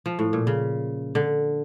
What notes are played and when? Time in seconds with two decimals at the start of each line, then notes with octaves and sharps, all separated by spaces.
0.06 F3
0.19 A2
0.33 A#2
0.47 C#3
1.15 D3